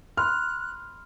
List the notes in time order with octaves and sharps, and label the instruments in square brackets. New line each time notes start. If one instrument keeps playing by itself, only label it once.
[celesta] B5 C6 [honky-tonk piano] F6 [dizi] F#6